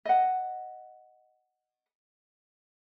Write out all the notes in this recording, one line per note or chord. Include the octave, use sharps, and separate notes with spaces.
D#5 F#5